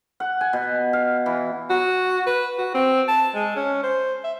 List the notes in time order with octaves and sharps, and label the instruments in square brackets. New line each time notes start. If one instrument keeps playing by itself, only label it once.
[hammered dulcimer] F#5
G#5
B2
F5
E3
[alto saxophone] F#4
B4
F#4
C4
A5
G#3
C#4
C5
E5